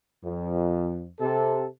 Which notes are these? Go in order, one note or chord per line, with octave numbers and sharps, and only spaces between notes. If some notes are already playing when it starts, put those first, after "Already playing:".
F2
C3 A4